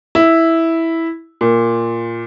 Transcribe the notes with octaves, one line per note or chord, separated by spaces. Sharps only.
E4
A#2